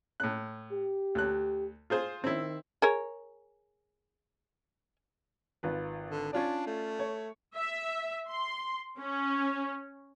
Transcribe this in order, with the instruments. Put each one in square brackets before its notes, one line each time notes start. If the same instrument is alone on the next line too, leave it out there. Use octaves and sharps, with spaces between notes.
[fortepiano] A2 F#6
[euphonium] G4
[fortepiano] D2 F#6
F4 G#4 C5
[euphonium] D#3 [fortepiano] C4 E4
[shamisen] G#4 A#4 C#5
[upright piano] G#1 F4 B4
[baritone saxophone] D3
[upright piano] C#4 F4 D5 [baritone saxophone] D4
[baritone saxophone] A3
[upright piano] C#5
[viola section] E5
C6
C#4